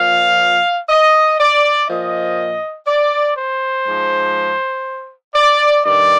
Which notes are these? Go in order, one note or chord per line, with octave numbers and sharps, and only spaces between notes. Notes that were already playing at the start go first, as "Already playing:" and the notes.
Already playing: A#2 F3 F5
D#5
D5
A#2 F3 D#5
D5
C5
G#2 F3
D5
G2 D#3 D5